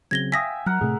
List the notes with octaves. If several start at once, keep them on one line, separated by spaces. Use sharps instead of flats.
C#3 F#3 C4 G#6 A#6 G7
E5 F5 G5 G#5 D#6 A#6 B6
F#3 A#4 F#5
A2 C3 A3 G#4